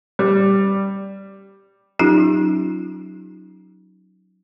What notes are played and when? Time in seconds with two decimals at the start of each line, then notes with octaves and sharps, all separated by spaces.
0.19 G3
1.99 F#3 C#4 D#4 F4 G4